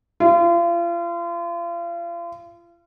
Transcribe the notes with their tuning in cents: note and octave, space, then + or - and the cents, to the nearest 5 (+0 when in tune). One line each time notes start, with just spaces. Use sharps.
F4 -35